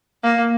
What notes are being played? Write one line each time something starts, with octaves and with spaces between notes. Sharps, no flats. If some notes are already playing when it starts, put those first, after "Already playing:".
A#3